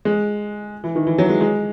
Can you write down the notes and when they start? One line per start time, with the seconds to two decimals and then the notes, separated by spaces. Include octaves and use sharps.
0.05 G#3
0.84 E3
0.96 D#3
1.07 E3
1.18 F#3
1.29 G#3
1.41 G#3